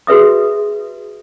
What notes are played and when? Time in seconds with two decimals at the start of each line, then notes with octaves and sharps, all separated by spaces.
0.07 F#4 G#4 B4 E5 D#6